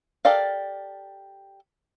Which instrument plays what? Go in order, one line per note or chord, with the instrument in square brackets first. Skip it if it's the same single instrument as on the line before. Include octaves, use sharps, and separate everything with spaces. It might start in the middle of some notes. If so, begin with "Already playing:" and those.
[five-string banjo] G4 A4 A#4 D5 F5